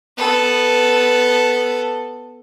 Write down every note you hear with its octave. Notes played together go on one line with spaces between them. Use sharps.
B3 A4